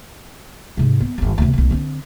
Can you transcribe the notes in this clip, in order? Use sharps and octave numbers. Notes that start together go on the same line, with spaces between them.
G#2 C3
B3
G1 D#3
D2 C3
B1 A2
D3 C4